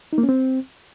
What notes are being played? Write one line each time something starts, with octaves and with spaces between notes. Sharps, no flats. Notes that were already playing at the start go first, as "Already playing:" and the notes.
D#4
A#3
C#4
C4